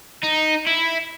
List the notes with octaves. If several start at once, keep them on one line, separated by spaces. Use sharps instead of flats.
D#4
E4